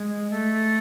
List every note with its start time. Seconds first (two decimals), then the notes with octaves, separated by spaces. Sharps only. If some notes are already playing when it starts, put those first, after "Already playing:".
Already playing: G#3
0.30 A3